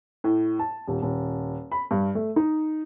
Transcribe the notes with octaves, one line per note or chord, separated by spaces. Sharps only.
A2
A5
D#1
D#1
B5
G2
A3
D#4